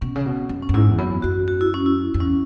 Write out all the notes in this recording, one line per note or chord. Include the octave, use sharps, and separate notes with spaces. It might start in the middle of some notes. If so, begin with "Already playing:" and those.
B2 C#4
C#3
B2
F#2
C#4
F#2
G#2 E4
E2
F#2 B3
F#2 F#4
F#4
E4
C#4
E4
F#2
E2 C#4